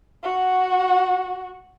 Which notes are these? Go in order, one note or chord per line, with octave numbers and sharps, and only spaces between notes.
F#4 F#5